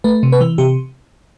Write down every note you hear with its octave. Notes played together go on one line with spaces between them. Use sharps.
A3 B4
C3
B4
E3
C3 G4